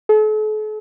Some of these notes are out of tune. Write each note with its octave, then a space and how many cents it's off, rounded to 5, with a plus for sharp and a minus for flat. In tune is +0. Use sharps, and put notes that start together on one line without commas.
A4 -45